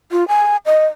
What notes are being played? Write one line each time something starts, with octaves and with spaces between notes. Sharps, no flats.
F4
G#5
D#5